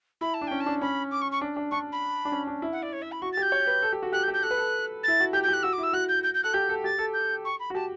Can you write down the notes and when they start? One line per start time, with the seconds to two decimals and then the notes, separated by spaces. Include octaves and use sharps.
0.21 E4 B5
0.34 A5
0.41 D4
0.47 C#4 G5
0.60 A5
0.66 D4
0.81 C#4 B5
1.11 D6
1.21 C#6
1.32 C#6
1.41 D4
1.56 D4
1.71 D4 C#6
1.92 B5
2.25 D4
2.32 C#4
2.47 D4
2.62 E4
2.72 F#5
2.82 D5
2.93 C#5
3.02 E5
3.12 B5
3.22 F#4 C#6
3.33 A6
3.37 G4 G6
3.52 C#5
3.67 B4
3.82 A4
3.93 G4
4.03 F#4
4.12 G4 F#6
4.23 G6
4.28 G4
4.33 G6
4.43 A4 F#6
4.51 B4
4.57 A4
5.03 E4 A6
5.20 F#4
5.33 G4 G6
5.43 G6
5.48 G4 F#6
5.63 F#4 E6
5.73 D6
5.78 E4
5.83 E6
5.93 F#4 F#6
6.09 G6
6.23 G6
6.34 G6
6.43 A4 F#6
6.53 G4 G6
6.69 A4
6.84 G4 A6
6.98 A4
7.14 G6
7.45 C#6
7.60 B5
7.70 F#4
7.75 G4 A5